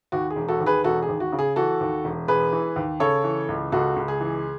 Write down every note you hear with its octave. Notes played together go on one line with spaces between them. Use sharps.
D#2 F#4
G#4
E1
F#4 A4
D#2
G#4 B4
E1 F#4 A4
G#4
D#2
F#4
C#3
G#4
E3 F#4 A4
D#2
E1
E1 G#4 B4
E3
D#2
C#3 A4 C#5
E3
C#2
C#2 F#4 A4
C#2
G#4
E3